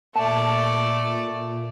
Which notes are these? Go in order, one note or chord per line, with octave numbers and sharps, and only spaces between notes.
A#2 A3 D5 A5